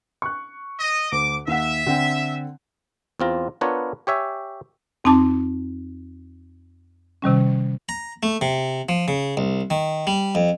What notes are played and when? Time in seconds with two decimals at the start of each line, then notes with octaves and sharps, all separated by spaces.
0.22 C#6 F#6
0.80 D#5
1.12 D2 D6
1.48 D#2 E5 F#5
1.86 D3 C4 G5
3.20 E2 C4 F4 A#5
3.61 B3 D4 F4 A#4 B4 C#5
4.07 G4 C#5 E5 G#5
5.04 F2 C4 D#4 A5 D6
7.22 C3 D#3 G3 C#4
7.89 A#5
8.23 A3
8.41 C3
8.89 F3
9.08 C#3
9.37 C2
9.70 D#3
10.07 G3
10.35 F2